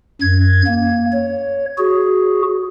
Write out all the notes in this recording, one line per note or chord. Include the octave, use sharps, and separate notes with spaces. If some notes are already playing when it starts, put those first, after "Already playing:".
F#2 G#6
A#3
C#5
F#4 G#4